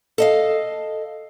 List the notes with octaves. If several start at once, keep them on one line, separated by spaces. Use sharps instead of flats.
A4 D#5 F5